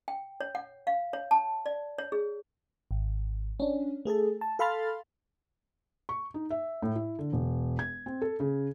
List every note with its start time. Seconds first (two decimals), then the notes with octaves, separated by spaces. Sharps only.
0.08 G5
0.41 C#5
0.55 F#5
0.87 F5
1.13 C#5
1.31 A5
1.66 D5
1.98 C#5
2.12 G#4
2.91 G#1
3.60 C#4 D4
4.05 A3 G#4 A4 A5
4.41 A5
4.59 A4 F5 B5 C6 F6 A6
6.09 C#6
6.34 D#4
6.51 E5
6.82 A2
6.96 E4
7.19 D3
7.33 E1
7.79 G#6
8.06 C4
8.22 A4
8.40 C#3